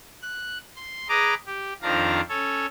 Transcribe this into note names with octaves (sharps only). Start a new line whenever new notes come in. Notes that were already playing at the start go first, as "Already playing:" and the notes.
F#6
C6
G#4 B4 D#5 A#5 D6
G4
F2 D#3 F3 D4 F5 A#5
C#4 A4 C#5